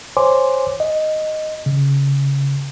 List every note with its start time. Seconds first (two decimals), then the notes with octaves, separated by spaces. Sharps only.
0.17 C5 C#5 G#5 C6 D6
0.80 D#5
1.66 C#3